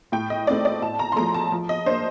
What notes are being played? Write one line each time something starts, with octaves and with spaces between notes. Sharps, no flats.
A2 G5
D#5
A3 C4 D#4 D5
D5
A2 A5
A#5
C6
F3 A3 A#5
A5
F3
D#5
A#3 D4 C5